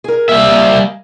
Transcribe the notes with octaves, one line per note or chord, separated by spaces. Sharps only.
G#4 A#4
G3 A#3 E5
A#3 D#5 G#5